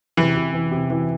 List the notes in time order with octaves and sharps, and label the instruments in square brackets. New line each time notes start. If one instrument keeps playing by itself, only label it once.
[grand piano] C3 [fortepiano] E3
[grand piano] C3
E3
C3
E3